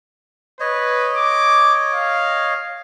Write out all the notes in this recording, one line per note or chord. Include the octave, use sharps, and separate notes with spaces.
B4 C#5 D#5
D6
F5